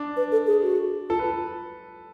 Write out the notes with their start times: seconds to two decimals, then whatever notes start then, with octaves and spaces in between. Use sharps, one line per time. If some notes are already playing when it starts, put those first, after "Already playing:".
Already playing: D4
0.17 B4
0.32 A4
0.47 G#4
0.63 F#4
1.09 F4 A4
1.19 B4